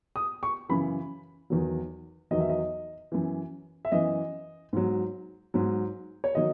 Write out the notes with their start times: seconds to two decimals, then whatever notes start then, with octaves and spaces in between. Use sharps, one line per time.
0.16 D#6
0.43 C#6
0.69 F#2 C#3 E3 B5
1.50 E2 D#3 F#3
2.31 E2 D#3 F#3 D#5
2.40 E5
2.50 D#5
3.12 F#2 E3
3.85 E5
3.92 F#2 E3 D#5
4.73 G#2 F#3
5.54 G#2 F#3
6.24 C#5
6.35 D#3 F#3 D#5